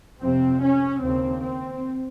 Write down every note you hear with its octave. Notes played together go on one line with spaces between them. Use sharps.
F2 C3 C4
C#4
D#2 C#3 C4
C4